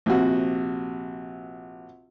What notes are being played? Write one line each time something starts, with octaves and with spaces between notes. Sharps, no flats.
A#1 C3 F#4